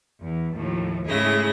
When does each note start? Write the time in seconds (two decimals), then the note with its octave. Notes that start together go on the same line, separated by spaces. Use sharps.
0.22 E2
0.55 D#2 A2 F3
1.07 G#2 C#3 A3 E4 G#4 A#6